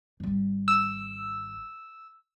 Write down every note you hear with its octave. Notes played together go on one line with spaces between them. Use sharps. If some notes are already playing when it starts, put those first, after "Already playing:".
G#1 G3
E6